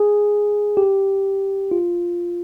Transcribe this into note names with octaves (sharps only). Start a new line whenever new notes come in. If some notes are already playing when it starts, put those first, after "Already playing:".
Already playing: G#4
G4
F4